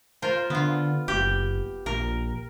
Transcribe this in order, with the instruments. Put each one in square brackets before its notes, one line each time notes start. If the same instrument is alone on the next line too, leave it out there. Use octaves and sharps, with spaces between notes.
[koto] F4 A#4 C5
[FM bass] D3 [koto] B3 F4
[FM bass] F#1 [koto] G4
[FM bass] A#1 [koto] A#4